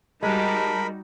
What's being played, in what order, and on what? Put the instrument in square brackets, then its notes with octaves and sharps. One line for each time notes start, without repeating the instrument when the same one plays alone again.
[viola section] G3 D#4 F#4 [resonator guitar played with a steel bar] G#3 [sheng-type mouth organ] A#4 B5 [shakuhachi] A5